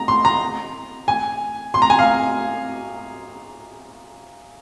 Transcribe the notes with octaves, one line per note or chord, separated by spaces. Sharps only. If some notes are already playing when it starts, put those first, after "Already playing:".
Already playing: A#5
C6
A#5
G#5
C6
A#5
G#5
F5